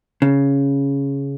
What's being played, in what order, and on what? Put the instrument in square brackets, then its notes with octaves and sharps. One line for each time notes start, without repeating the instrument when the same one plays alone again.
[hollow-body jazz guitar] C#3